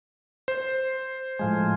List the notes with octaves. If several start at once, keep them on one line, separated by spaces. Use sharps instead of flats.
C5
A2 F3 G#3